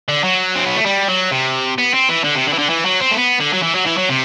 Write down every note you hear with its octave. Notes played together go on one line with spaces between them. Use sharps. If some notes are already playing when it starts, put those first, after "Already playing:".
D3
F#3
C4
B3
A3
G3
F#3
C3
B3
C4
E3
D3
C3
D3
E3
D3
E3
F#3
C4
A3
B3
D3
F#3
E3
F#3
E3
F#3
C3